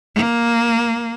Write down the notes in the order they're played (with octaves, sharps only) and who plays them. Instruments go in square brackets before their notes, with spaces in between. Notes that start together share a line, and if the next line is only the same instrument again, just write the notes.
[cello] A#3